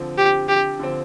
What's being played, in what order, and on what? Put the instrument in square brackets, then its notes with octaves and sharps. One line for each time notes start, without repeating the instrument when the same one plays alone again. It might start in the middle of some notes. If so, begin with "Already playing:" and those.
Already playing: [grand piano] D3 F3 C4
[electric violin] G4
G4
[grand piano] D3 F3 C4